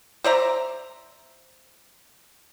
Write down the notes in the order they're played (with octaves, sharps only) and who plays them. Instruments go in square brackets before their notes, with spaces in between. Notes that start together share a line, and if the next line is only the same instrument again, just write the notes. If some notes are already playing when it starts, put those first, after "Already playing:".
[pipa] C5 D5 E5 A#5